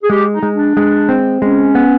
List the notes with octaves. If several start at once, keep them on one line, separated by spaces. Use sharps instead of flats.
G#4
G#3 G4
D#4
G#3
D4
G#3
C4
G#3 C#4
B3